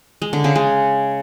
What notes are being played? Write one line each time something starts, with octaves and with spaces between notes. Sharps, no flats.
G#3
D3
C#3
G#3